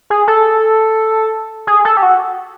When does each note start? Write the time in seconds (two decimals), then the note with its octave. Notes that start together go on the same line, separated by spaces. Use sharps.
0.10 G#4
0.28 A4
1.67 G#4
1.85 A4
1.97 G4
2.02 F#4